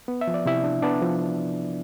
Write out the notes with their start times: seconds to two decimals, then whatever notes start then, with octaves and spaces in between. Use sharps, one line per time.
0.08 B3
0.21 E5
0.27 F3
0.34 D5
0.46 C3 E4 E5
0.64 D4
0.82 B3 D4 D5
1.02 F3